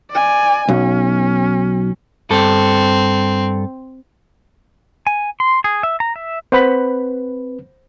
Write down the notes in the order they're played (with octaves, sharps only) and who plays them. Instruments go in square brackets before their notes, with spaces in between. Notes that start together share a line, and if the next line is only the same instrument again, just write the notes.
[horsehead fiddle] D5 G#5
[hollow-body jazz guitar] B1 [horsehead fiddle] C#4
[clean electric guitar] G2 A4 [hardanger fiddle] C4
[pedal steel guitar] G#5
C6
G#4
E5
A#5
E5
[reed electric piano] C4 B4 [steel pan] C5 F#5 B5